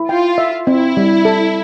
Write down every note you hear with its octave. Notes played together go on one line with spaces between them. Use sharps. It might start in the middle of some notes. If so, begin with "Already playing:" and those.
Already playing: E4
F4 G5
E5
C4 E4
G3
A4